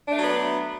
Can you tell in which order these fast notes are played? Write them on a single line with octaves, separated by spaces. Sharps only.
D4 A3 F#3 B3